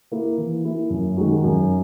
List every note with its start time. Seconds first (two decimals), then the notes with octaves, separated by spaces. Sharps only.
0.12 A#3 E4
0.38 E3
0.65 A#3 E4
0.90 F#2
1.17 D#3 G#3 D#4 F#4
1.44 F#2